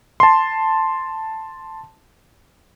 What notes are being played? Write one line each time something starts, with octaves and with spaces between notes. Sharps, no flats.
A5 C6